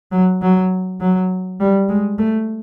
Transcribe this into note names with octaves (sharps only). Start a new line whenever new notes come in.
F#3
F#3
F#3
G3
G#3
A3